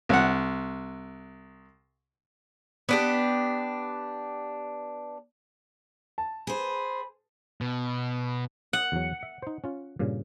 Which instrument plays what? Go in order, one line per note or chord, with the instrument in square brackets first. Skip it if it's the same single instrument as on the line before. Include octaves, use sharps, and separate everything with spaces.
[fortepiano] C2 F#5
[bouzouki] B3 D4 G4
[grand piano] A5
[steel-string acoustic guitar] G#4 C5 [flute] B5
[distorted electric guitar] B2
[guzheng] F#5
[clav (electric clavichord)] E2 F#3
E5
D#4 C5
C#4 F4
G2 A#2 C#3